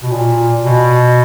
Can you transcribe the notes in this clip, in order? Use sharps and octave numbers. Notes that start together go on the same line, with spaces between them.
B2
A#2
B2